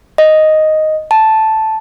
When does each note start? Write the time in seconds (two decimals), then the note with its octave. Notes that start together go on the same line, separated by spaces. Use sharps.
0.18 D#5
1.11 A5